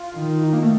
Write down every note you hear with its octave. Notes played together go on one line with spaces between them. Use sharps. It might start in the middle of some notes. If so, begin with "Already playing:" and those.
Already playing: F4
D#3
D#4
A#3
A3